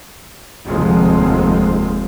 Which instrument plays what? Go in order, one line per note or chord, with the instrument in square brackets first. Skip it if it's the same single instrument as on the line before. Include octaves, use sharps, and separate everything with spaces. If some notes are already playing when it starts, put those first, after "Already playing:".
[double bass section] F1 D#2 F3 G#3